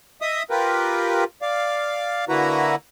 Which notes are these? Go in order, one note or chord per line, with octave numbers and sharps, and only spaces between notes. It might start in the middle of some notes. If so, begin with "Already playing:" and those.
D#5 E5 D#6
F4 G4 A#4 B4
D5 F5
D3 A#3 E4 F#4 B4 A#5